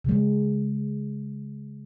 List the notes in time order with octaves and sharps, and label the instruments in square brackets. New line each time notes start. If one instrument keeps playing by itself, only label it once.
[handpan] C#3 G#3